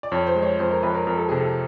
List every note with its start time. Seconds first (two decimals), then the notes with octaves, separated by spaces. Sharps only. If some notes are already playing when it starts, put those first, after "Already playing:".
0.03 D5
0.12 F2 C#5
0.27 C5
0.35 G#3
0.43 C#5
0.59 F2 C5
0.71 A#4
0.83 F2 B4
0.94 A#4
1.07 F2 A#4
1.17 A4
1.29 C3 G#4
1.40 A4